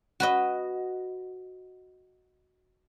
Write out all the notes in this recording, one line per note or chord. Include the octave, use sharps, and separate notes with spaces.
F#4 B4 D#5